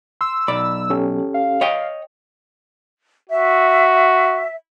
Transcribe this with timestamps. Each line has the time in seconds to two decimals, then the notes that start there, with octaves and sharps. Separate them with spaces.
0.21 C6 E6
0.48 B1 D5 B5
0.90 C#4 G4 A4
1.34 F5
1.61 C#5 D#5 G5
3.29 F#4 E5